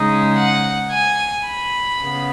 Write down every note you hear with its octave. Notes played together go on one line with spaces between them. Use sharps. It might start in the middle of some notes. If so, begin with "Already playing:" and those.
Already playing: C#3 G#3 D#4
F#5
G#5
B5
C#3 B3